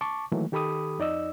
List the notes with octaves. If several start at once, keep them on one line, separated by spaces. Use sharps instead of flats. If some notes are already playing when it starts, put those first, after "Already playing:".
A5 C#6 D6
D#3 E3 F#3 A3 A#3
D#3 G4 A4 B5 D6 D#6
F2 D#4 D5 D#5 E6